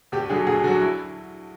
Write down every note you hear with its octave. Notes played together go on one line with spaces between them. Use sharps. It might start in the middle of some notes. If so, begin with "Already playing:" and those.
D2 G4
D3 F#3 G#4
D2 G#4
D3 F#3 F#4
E4